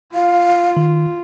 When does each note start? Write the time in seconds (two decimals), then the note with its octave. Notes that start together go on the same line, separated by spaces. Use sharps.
0.14 F4 F5
0.77 D#3